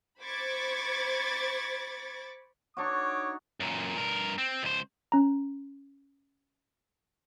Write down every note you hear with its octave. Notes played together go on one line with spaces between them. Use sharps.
C5 B5 C#6 D6 G#6 A6
D4 D#4 F#4 C#5 D6
F#2 A#2
G2 A#4
C4
C#2 C5
C#4 A#5